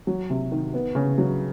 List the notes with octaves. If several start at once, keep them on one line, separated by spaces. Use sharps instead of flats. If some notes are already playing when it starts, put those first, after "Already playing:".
F#3
C3
D#3
B3
C#3
F#3